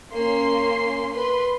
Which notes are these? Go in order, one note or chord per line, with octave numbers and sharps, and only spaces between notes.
A#3 C#4 C6 C7
B4 C6